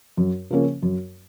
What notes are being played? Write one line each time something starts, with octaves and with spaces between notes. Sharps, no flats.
F#2
C#3 F3 A#3 C#4
F#2